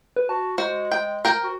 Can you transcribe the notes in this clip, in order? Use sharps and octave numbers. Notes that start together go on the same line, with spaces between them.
B4
F#4 A5
G#3 F#4 C5
G5
A#4 G5
F#4